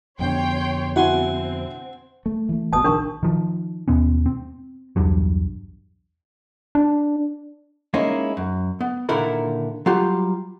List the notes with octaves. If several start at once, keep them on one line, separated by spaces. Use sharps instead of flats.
F2 B2 D3 C#5 G5 C6
C4 E4 F#4 F#5 G#5 C6
A3
E3 A3
G#1 B2 A5 D#6
A#1 D3 D#3 D4 A#4 C#6
D#3 F3
D#2 B2 B3 C#4
C4
B1 E2 G2 F#3
D4
G#3 A#3 C#4 D#4 E4
F#2
B3
A#2 D3 D#3 E4 A#4 B5
F#3 G3 F4 G4